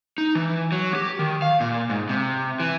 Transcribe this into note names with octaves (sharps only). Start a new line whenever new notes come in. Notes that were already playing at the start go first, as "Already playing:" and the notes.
D#4
E3
F#3
G4
D#3
F5
A#2
G#2
C3
E3